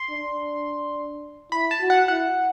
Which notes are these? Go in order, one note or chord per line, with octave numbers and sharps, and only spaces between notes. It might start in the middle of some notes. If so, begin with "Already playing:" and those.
Already playing: C6
D4
E4 B5
A5
F#4
F#5
E4 F#5